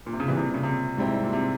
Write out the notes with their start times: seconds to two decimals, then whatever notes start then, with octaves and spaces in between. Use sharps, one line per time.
0.06 A#2
0.13 C3
0.20 C#3
0.27 A#2 E3 G3 C4
0.37 C3
0.54 C#3
0.63 C3
0.97 G#2 G3 C4 E4
1.23 A#2
1.33 C3